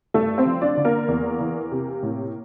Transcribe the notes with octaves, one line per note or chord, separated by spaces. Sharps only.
G2 A3 A4
C4 C5
F3
D4 D5
D3
A#3 A#4
E2
E3
C3
A2